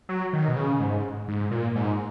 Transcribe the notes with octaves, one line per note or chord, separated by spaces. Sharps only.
F#3
D#3
B2
C#3
G#2
G#2
A#2
G#2